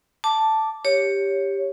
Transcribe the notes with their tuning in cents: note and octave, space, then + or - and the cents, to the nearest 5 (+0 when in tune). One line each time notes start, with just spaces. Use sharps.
A5 +0 D6 +0
G4 +10 C#5 +0